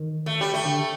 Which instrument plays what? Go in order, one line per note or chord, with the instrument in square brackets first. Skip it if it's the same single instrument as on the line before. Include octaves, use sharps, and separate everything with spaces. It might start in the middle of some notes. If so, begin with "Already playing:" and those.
Already playing: [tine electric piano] D#3
[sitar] A3
G3
A3
[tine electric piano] D3